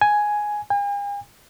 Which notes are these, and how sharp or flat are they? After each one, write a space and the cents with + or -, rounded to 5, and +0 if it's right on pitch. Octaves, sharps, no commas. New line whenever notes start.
G#5 +5
G#5 -45